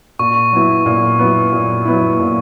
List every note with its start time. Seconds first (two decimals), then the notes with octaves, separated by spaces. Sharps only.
0.19 A#2 C#6
0.53 F#3 B3 E4
0.86 A#2
1.19 F#3 B3 E4
1.53 A#2
1.85 F#3 B3 E4
2.20 A#2